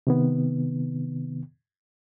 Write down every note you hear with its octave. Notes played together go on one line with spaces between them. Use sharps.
C3 D#3 B3